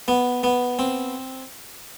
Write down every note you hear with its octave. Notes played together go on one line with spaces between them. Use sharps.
B3
B3
C4